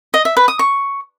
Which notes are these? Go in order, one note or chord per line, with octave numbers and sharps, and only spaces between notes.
D#5
E5
B4
D#6
C#6